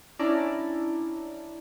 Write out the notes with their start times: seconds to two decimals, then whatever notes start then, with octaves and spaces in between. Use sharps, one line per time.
0.19 C#4 D4 E4 D5 A5 A#5